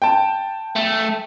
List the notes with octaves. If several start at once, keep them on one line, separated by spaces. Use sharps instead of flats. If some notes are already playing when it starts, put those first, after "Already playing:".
G5 A5
A3